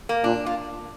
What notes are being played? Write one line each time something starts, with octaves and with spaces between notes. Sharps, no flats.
A#3
A#2 D4
F4